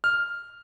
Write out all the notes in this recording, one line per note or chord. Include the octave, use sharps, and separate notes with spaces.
F6